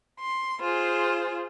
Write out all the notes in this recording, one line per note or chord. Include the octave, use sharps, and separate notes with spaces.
C6
F4 G#4 C5